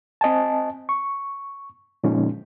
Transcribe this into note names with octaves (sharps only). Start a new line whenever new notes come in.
C4 D#5 G#5 A5
C#6
A#2 D3 F3 G#3 C#4 D#4